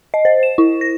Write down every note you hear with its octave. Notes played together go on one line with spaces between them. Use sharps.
D#5
C5
E7
E4
A#6